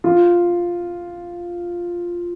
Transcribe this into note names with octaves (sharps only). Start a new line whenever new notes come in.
F4